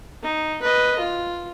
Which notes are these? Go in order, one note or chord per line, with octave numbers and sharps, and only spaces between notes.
D#4
B4 D#5
F4